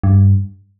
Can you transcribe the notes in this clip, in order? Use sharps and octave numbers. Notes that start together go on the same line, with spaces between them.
G2